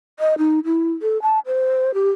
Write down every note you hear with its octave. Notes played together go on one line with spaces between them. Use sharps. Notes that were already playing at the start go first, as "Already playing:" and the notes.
D#5
D#4
E4
A4
A5
C5
G4